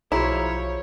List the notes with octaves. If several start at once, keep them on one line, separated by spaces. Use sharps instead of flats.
B1 F3 E4 F#4 G#4 C#5 A#5